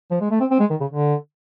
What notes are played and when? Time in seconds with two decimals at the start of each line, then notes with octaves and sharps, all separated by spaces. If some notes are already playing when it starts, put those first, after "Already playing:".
0.11 F3
0.21 G#3
0.31 A3
0.40 C4
0.51 C4
0.60 G#3
0.70 D#3
0.80 C#3
0.90 D3